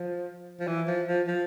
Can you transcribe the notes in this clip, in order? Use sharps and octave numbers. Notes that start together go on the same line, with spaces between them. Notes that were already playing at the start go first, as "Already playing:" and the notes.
Already playing: F3
F3
E3
F3
F3
F3